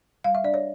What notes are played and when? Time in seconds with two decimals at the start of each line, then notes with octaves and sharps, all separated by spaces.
0.24 G3 F5
0.35 E5
0.44 D4 D5
0.54 C#5